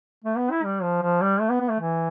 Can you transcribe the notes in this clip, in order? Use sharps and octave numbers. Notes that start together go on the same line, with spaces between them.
A3
B3
E4
G3
F3
F3
G3
A3
B3
B3
A3
E3